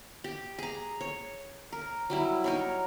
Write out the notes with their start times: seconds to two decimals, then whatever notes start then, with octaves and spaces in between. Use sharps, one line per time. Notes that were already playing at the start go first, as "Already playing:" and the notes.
0.24 G4
0.58 G#4 A#5
1.01 C#5
1.72 A#4
2.10 F#3 G3 E4
2.44 D#4 A#4 C#5